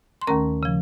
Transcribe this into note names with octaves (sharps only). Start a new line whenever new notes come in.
C6
D#2 D#3 A3 C#4 A#4 A#5
C#3 F3